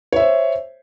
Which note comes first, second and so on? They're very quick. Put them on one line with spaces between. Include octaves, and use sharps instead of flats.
C#5 E5 C5